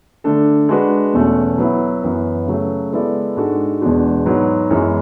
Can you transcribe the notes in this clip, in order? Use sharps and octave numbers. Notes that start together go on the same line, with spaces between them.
D3 A3 D4 A4
G#3 D4 F#4 B4
E2 B2 A3 C#4
F#3 B3 E4
F#2 E3 B3
C#3 F#3 A3
G#3 B3 E4 A4 D5
G#2 G#3 D4 F#4 A4
E2 B2 G#3 D4 F#4
G#2 F#3 B3
F#2 E3 G#3 B3